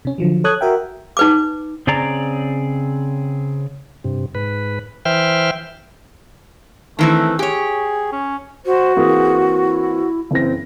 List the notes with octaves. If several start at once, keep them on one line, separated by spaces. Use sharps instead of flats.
C3 C#4
D3 F3 F#3
A4 C#5 D#6 F#6 G#6
F#4 A#4 E5 G5
D#4 B4 D6
C#3 C4 G#4 D5 A#5
G2 C3
G#2 B4
E3 C5 E5 G5 F6
D#3 E3 A3 C4
G4 G#4 C#5
C#4
F#4 C5
E3 A#3 C4 G#4
E4
F#1 E3 C4 A#6